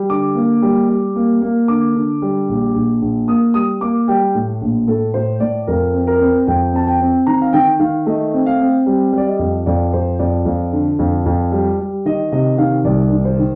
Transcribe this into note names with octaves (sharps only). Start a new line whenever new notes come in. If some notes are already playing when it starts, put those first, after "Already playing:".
Already playing: G3
D3 D6
A#3
G3
G3
A#3
A#3
D3 D6
D3
G3
A#1
A#1
A#1
A#3 D#6
G3 D#6
A#3 D6
G3 G5
A2
A#1
A2 A4
A2 C5
A2 D5
F2 A#4
C4
A#4
C4
F2 G5
C4 A5
G5
C4
D#3 A#5
F5
D#3 G5
D#3 F5
A3 D#5
C4
F5
C4
G3
G3
D5
D#5
F2
F2 D5
F2 C5
F2 D5
F2
D3
F2
F2
G3
G3
D#3 D#5
C3 D#5
D#3 F5
C2 D5
D#3
C5
D#3